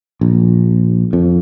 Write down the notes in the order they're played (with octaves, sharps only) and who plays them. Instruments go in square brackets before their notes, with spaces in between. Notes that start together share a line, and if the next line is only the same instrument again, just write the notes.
[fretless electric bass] A#1
F2